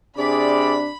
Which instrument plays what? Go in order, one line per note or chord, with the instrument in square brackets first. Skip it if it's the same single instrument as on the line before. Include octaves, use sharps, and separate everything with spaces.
[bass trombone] C3 [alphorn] D4 [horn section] G#4 D5 [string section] B5